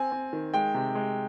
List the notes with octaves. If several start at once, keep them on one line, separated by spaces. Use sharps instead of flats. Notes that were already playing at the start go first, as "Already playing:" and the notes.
Already playing: C4 G#5
C4
D#3
G#3 G5
C3
G#3